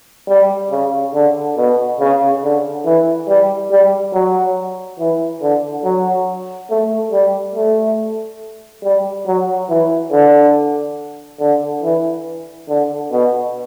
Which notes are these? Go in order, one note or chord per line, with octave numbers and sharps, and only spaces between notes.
G3
C#3
D3
B2
C#3
D3
E3
G3
G3
F#3
E3
D3
F#3
A3
G3
A3
G3
F#3
E3
D3
D3
E3
D3
B2